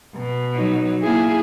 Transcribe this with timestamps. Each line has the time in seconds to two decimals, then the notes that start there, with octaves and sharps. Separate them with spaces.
0.16 B2
0.55 F#3 D#4
1.03 A#3 E4 G#4